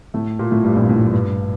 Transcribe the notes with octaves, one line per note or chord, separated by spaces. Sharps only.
A2 A3
A#2 A#3
A2 A3
G2 G3
A#1 A#2
A2
G2
A2
G2